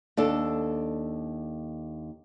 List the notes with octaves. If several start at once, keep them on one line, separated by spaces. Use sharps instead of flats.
D#2 D4 A4